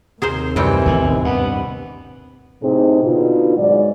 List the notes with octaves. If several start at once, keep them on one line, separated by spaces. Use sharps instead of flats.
D#2 C3 G#4 A#4 C5
F#2 A2 E3 G3 C4
A1 E2 D#3
G2 B3
A2 C3 C4 D#4 G#4
B2 D3 D#4 F4 F#4
G#2 F#3 G#3 D5